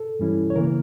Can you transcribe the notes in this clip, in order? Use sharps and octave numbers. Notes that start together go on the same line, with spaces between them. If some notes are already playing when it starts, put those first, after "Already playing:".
Already playing: A4
G2 E3 G3 C#4 E4
C#5
C#3 E3 A#3 A#4